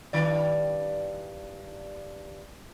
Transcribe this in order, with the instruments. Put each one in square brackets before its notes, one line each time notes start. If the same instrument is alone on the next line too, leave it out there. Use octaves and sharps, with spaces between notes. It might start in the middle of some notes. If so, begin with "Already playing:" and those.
[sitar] G2 D#3 D5